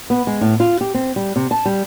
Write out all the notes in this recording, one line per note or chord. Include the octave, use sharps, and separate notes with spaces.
B3
G#3
A2
F4
G4
C4
G3
C3
A5
G3